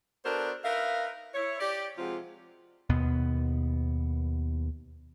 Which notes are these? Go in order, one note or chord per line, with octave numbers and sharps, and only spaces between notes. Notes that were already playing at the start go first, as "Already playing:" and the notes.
B3 D4 F#4 A4 A#4 C5
D#4 A#4 B4 E5 F5
E4 C#5
G4 D5
C3 F3 G#3 C4 F4 F#4
D#2 B2 B3